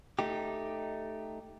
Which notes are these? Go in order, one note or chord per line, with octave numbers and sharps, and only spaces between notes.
A3 D#4 G4